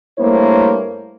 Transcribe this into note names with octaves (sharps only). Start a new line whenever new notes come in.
G2 A3 A#3 E4 C5 C#5